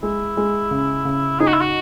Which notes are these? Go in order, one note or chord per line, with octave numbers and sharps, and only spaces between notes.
G#3 E4
G#3
C#3
C#3
D#4 G#4
F#4
E4
F#4